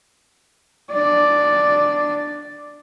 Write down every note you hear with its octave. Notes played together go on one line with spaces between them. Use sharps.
D4 D5